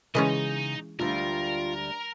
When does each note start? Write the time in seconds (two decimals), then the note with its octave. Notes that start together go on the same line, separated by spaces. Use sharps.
0.15 C#3 E3 G#3 C#4 D#4 D#5
1.00 D2 G3 F4 A#4